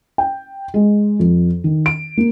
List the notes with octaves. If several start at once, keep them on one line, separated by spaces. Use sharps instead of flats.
G5
G#3
F2
D#3
D7
A#3